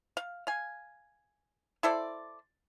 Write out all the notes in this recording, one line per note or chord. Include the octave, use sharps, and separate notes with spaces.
F5
F5 G#5
E4 A4 C5 D5